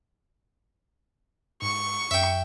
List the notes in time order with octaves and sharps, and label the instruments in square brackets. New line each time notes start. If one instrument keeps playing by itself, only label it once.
[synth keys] G#2 [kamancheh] C#6
[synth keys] F#2 [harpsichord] E5 G5